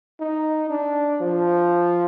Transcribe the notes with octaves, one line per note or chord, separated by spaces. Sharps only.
D#4
D4
F3